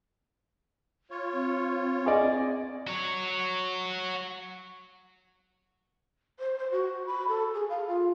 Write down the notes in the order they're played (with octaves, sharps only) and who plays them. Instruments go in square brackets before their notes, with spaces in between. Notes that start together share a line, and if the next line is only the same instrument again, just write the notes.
[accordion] F4 C#5
[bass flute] C4
[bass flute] C4 [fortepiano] G#4 D5 D#5
[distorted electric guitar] F#4 C#5
[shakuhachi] C5
C5
F#4
B5
A4
G#4
F5
F4